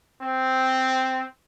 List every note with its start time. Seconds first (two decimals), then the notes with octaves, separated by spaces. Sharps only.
0.23 C4